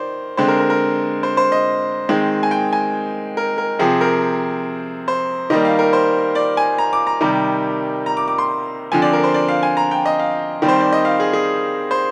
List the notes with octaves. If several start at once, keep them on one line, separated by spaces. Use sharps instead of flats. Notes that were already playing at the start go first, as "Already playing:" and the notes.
Already playing: D#3 C5 D5
D3 G#3 C4 C5
A#4
A#4
A#4
C5
C5
D#5
D#3 G#3 C4
G#5
G5
G#5
A#4
A#4
C3 F3 C4 G#4
A#4
C5
D#3 G3 A#3 D#5
F5
A#4
C5
D5
G#5
A#5
D6
A#5
C3 D#3 G3
A#5
D6
D6
C6
D3 F3 C4 G#5
D5
A#4
C5
D5
F5
G#5
A#5
G5
D#5
F5
D#3 G3 C4
C5
D5
D#5
F5
G#4
G#4
C5